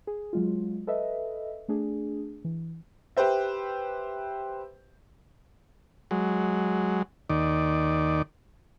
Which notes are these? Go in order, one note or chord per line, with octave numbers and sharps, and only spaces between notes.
G#4
F#3 G#3 F4
A4 B4 D#5 E5
A3 D4 G#4
E3
G4 B4 C5 E5
F#3 G#3
D#2 D#3 D5